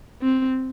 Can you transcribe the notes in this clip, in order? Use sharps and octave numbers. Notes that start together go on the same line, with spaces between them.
C4